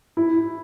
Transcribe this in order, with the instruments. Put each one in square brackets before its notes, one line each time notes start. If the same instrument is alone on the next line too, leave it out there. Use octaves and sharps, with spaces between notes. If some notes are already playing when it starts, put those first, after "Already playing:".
[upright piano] E4